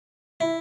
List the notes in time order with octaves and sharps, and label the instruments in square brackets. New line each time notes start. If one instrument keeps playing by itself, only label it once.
[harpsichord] E4